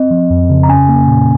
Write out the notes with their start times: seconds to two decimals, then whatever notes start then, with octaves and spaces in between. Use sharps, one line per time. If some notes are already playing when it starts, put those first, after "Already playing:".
Already playing: C4 D#5
0.11 F3
0.30 F2
0.50 C#3
0.63 A#5
0.69 C#4 G#5
0.89 A#3
1.08 A#2